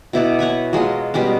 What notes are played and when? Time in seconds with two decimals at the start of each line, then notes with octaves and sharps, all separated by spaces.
0.13 B2 E4 D5 F#5
0.39 C#5 F#5 G#5 B5
0.73 F#3 G#3 F4 D#5
1.14 B2 G3 G#3 C#4